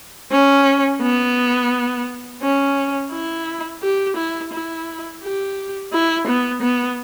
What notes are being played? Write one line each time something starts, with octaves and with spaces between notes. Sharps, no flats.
C#4
B3
C#4
E4
G4
E4
E4
G4
E4
B3
B3